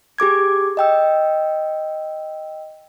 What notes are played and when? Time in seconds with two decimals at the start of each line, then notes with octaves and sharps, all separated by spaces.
0.18 G4 G#4 D6 G#6
0.77 D#5 G5 E6